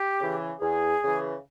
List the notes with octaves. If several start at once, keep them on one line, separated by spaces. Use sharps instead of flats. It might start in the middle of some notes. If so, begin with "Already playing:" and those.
Already playing: G4
C#3 E3
E2 G#4
C#3 E3